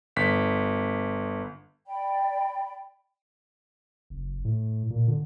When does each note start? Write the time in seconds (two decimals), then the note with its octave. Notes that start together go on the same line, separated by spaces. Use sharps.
0.16 G1 B6
1.86 D5 G5 B5
4.10 F#1
4.45 A2
4.90 A#2
5.08 D3